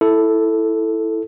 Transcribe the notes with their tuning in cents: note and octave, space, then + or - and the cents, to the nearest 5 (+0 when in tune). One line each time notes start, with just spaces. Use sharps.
E4 +0 A4 +0